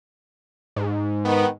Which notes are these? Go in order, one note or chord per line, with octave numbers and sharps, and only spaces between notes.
G#2
D#3 B3